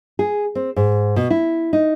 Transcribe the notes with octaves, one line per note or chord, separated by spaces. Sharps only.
G#4
C4
G#2
B2
E4
D#4